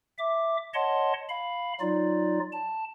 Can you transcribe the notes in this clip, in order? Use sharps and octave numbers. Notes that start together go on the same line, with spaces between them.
E5 D6
C#5 D#5 F#5 A5 C6
F5 B5
F#3 D#4 F4 D5
A5